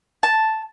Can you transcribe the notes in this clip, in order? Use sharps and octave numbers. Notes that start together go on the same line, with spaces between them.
A5